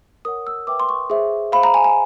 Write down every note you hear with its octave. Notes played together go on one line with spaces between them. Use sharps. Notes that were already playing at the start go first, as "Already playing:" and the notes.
A#4 C#5 F#5 D#6
E6
B4 E5 G5 D6
C6
C#6
G#4 C5 E5
C5 F5 B5
A#5
G#5
G#5